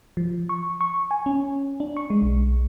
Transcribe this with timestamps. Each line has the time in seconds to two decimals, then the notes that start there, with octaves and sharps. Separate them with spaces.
0.17 F3
0.49 C#6
0.81 C#6
1.11 G#5
1.26 C#4
1.80 D4
1.97 C#6
2.10 G#3
2.22 B1